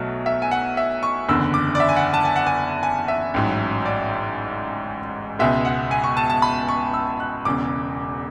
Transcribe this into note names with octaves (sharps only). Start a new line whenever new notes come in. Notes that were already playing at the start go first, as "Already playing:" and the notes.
Already playing: B1 B2 F#3 A3
E5
G#5
F#5
E5
C#6
F#1 E2 D3 E6
D6
D5
E5
G#5
F#5
A5
G#5
F#5
G#5
G#5
E5
A1 G#2 F#3
D5
C#2 B2 G#3 E5
F#5
G#5
C#6
A5
A5
B5
C#6
E6
F#6
E1 E2 C#3 D6